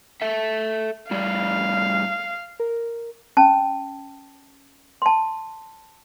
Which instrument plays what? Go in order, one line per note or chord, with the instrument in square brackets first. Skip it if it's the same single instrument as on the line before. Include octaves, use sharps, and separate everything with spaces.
[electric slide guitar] A4 E5
[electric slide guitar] A2 G3 D5 [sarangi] F5
[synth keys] A#4
[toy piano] C#4 A5
A5 C6